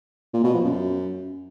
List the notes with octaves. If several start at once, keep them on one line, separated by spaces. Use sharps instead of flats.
A#2
B2
F3
F#2